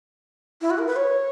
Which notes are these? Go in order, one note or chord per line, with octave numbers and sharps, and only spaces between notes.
E4
F#4
A#4
B4
C#5